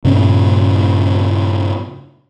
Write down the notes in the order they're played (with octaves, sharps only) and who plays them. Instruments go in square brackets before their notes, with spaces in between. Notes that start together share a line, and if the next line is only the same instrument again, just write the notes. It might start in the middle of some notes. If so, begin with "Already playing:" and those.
[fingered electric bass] G2 A#2 C#3 C#4